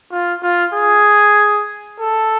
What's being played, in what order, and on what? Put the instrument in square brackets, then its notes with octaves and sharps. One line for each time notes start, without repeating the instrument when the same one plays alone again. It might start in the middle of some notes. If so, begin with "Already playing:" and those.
[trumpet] F4
F4
G#4
A4